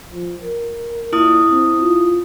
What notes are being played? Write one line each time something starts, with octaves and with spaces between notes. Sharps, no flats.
F3
A#4
A#2 E4 D#6
C4
F4